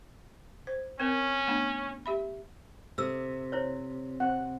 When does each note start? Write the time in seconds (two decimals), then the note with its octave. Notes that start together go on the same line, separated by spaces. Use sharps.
0.67 C5
1.00 C4 C#4 A#4
1.47 A3 B3 D4
2.06 G4 E5 B5
2.98 C3 A4 E6
3.52 E4 C5 C#5
4.20 C4 F#5